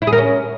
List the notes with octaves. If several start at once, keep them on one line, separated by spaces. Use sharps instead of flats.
E4
G#4
A#4
C#4